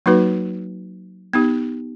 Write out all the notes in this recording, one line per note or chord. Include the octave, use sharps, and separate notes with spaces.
F#3 A#3 D#4 F#4 B4
B3 D#4 G4